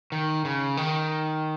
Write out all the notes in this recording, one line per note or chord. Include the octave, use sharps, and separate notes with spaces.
D#3
C#3
D#3